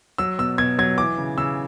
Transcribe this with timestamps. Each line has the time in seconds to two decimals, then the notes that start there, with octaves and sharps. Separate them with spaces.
0.18 F#3 E6
0.39 B2 E6
0.58 B2 G#6
0.79 F#3 G#6
0.98 E3 D6
1.18 C#3
1.38 C#3 E6